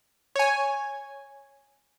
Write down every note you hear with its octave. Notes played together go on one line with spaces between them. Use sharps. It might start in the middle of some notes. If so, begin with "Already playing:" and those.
C#5 G#5